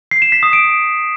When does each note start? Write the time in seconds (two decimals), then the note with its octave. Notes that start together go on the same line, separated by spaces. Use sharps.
0.11 C7
0.22 E7
0.32 B6
0.43 D#6
0.53 D7